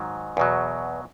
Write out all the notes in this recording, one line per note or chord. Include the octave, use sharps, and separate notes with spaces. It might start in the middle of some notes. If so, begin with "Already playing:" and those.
Already playing: G#2 D#3 F#3
E2 B2 F#3